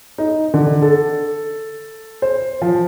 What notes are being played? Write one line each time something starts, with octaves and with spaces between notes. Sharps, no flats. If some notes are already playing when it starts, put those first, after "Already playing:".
D#4
D3
A4
C5
F3